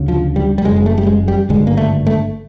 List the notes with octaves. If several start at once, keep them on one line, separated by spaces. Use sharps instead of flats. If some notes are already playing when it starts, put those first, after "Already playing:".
Already playing: D2 C#3
F3
G3
G3
F#1 F#2 C#3 G#3
G#3
A3
G3
G#3
G3
G#1 G2 D3 G#3
A#3
A3
A3